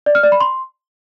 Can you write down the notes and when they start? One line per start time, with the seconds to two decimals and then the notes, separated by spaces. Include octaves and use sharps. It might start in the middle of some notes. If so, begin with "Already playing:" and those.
0.06 D5
0.15 F6
0.23 D5
0.32 B5
0.41 C6